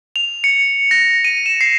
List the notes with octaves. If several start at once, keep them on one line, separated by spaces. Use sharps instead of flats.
F7
C#7
A#6
D#7
E7
C7